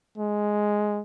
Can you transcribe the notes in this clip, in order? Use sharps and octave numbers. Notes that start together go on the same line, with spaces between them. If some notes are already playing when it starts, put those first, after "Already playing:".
G#3